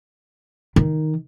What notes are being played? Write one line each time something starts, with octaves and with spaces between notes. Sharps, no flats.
D#3